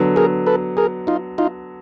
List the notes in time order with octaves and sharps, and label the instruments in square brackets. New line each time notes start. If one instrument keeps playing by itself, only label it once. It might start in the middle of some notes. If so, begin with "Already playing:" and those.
Already playing: [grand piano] D3 F#3 B3
[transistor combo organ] G#4 A#4
A4 B4
G#4 A#4
D#4 F4
D#4 F4